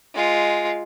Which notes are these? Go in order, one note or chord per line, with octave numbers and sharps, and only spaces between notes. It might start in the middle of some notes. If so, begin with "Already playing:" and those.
G#3 F4